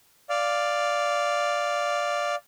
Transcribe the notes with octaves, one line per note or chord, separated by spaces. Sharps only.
D5 F5